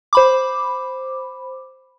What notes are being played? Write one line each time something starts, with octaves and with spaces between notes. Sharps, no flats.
C5 B5 D6